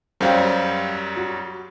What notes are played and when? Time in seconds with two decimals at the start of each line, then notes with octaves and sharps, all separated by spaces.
0.21 F#2 F#3 G3 C5 F5 G5
1.16 F#4